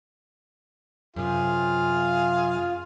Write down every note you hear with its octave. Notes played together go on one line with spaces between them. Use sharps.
F#2 C3 F4 G#4 F5